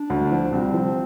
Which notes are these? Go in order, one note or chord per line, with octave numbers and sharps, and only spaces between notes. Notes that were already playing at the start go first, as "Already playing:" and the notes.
Already playing: D4
D2
F3
C2 C4
F3